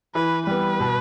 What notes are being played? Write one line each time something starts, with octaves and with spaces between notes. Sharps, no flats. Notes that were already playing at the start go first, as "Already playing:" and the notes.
E3 B4
G3 B3 B4
B2